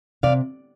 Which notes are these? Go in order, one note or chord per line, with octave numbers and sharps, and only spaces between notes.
C3 D5 F5